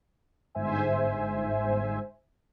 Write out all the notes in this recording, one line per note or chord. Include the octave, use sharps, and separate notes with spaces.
G1 G#2 C5 E5 G#5